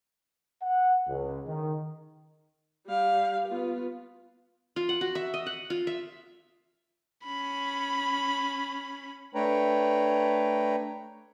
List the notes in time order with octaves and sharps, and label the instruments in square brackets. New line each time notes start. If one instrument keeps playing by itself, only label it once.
[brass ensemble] F#5
C#2
D#3
[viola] G3 F5
B3 F4
[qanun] F4
F#5
F#4
E5
D#5
F#5
F4
E5
[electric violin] C#4 B5
[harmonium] A3 D4 B4 C#5 G5 A#5